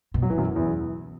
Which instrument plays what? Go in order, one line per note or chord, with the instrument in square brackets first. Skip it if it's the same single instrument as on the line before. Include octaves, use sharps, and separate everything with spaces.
[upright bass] B2
[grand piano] F#3
E3
F#2 F#3
E2 E3